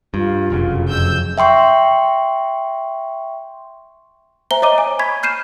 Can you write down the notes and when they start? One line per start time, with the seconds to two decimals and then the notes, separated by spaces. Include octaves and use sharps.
0.14 G2 F4
0.50 F1 F#2 C#3
0.90 F2 E6 G6
1.38 E5 G5 C6 C#6
4.51 C5 E5 G#5 A#5 G7
4.62 C#5 D#5 A#5 D6 D#6 D#7
4.78 G#5
4.99 B5 C#6 G#6 B6
5.23 F6 G6 C7 D#7 E7